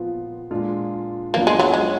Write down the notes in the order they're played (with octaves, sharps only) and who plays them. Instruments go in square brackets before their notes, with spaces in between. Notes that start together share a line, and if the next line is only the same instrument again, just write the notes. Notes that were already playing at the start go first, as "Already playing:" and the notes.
Already playing: [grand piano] A#2 F3 B3 F4
A#2 G#3 D4 F4
[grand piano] F#2 F3 B3 D4 F4 [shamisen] A#3
[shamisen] G#3
F#3
G#3